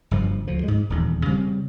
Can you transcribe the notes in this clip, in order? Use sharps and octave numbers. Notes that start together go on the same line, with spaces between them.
F#1 G2 F3
D2 F3
G#2 G#3
D#1 E2
C#3 G3 G#3 C4